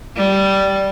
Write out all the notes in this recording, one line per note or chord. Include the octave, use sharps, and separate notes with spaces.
G3